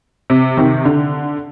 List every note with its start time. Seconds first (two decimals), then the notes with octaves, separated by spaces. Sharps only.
0.30 C3
0.57 C3 D#3
0.85 D3